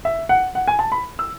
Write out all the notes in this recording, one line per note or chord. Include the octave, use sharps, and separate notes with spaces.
E5
F#5
F#5
G#5
A5
B5
E6